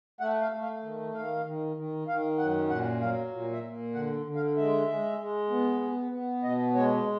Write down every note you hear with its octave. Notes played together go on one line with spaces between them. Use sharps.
A3 F#5
F5
A3
F5
D#3
D#3 F5
D#3
D#3
D#3 F5
F#2 F#5
A#2 F#5
F#3 F5
A#2
E5
A#2
D3 F#5
D3
F5
G#3 E5
G#3
G#3
B3
B3
B3
B2 D#5
G#3 C#5